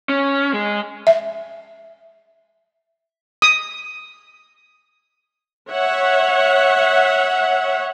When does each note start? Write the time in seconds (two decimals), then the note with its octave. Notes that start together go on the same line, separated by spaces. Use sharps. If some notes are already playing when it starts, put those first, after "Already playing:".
0.09 C#4
0.53 G#3
1.07 E5
3.42 D#6
5.71 C#5 E5 F#5